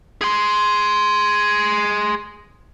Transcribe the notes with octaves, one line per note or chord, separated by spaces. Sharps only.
G#4 C6